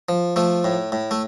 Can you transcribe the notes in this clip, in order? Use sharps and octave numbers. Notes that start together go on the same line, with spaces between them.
F3
F3 A3
A2
A2
A3